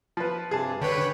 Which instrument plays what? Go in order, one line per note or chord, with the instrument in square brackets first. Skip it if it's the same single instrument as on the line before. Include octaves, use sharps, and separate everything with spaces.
[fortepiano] F3 B4
[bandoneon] G2 C3 [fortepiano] G#4 A5
[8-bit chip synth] D3 B4 [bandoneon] C#5 G5 B5